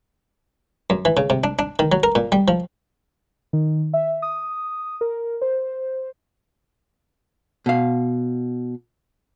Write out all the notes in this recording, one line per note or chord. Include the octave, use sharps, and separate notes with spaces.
F#2
E3
C#3
C3
D4
D4
D#3
F#3
A#4
A#2
G3
F3
D#3
E5
D#6
A#4
C5
B2 F5